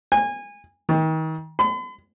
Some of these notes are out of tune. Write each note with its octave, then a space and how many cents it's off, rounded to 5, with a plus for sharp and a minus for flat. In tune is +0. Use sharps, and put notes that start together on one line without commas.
G#5 -25
D#3 +35
B5 +45